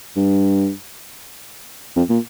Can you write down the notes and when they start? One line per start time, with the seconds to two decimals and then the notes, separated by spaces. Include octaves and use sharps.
0.17 G2
1.96 F2
2.09 A#2